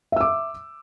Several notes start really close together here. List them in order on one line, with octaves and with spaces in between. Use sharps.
E5 E6 D6